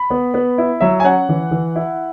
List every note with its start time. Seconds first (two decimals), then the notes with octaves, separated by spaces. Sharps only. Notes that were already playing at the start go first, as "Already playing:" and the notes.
Already playing: B5
0.10 B3
0.34 B3
0.58 E4
0.81 F#3 E5
1.00 G#5
1.04 C#4 F#5
1.29 E3
1.51 E3
1.76 E4